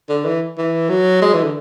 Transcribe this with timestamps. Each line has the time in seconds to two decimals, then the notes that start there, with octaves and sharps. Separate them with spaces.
0.09 D3
0.25 E3
0.58 E3
0.89 F#3
1.22 G#3
1.33 E3
1.43 D3